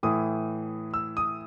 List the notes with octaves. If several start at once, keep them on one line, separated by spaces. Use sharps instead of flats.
A2 E3 D#6
E6
D#6